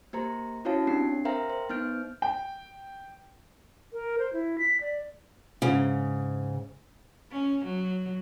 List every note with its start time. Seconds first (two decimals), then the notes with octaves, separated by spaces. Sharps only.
0.13 A#3 G4 C5 A#5
0.65 C#4 E4 F#4 C#5 F5 A5
0.87 C4 D4 G4 C7
1.25 A#4 C5 E5 F5 G5 A#5
1.50 C5
1.69 B3 D#4 F6 G6 D7
2.22 G5
3.93 A#4
4.18 C5
4.33 E4
4.58 B6
4.81 D5
5.62 G#2 C#3
7.31 C#4
7.65 F#3